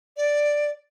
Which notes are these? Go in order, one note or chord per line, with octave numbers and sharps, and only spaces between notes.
D5